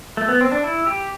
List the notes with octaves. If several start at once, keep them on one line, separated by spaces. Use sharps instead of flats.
A3
B3
C4
D4
E4
G4